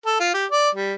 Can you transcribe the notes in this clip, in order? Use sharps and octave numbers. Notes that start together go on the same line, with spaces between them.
A4
F4
G4
D5
G3